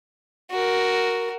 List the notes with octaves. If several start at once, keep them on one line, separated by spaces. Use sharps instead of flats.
F#4 A#4